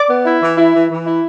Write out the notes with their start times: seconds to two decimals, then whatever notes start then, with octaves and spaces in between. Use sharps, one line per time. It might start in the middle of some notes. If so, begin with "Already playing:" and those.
Already playing: D5 D6
0.09 B3
0.25 E4
0.41 E3
0.58 E4
0.74 E3
0.90 E3
1.06 E4